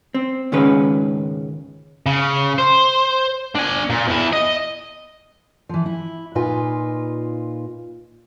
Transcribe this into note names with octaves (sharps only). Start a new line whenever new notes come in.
C4
C#2 G#2 D#3 G#3 C#4 B4
C#3
C5
D4 G#5
A#2
E2 E4
D#5
E3 F3
E4
A#2 D#4 F4 B4 G#5